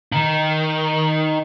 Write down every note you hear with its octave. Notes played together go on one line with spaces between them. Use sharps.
D#3